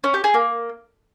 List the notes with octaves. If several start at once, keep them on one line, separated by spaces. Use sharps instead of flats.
C#4
G4
G#4
A#3